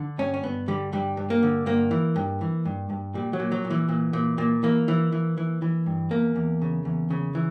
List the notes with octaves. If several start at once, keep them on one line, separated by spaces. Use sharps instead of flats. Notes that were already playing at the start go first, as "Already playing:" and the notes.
Already playing: D3
G2 C#4
C#4
G2 B3
D3 G3
G2 G3
G2
A#3
D3
G2 A#3
E3
G2
E3
G2
G2
A#2 G3
F#3
A#2
F#3
A#2
E3
A#2
A#2
A#2
E3 A#3
E3
E3
E3
E3
G2
E2 A#3
E2
C#3
E2
C#3
E3